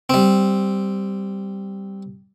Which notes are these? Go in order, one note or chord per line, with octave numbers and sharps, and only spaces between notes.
G3 C4